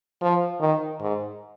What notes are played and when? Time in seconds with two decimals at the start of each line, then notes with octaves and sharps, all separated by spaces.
0.21 F3
0.60 D#3
1.00 G#2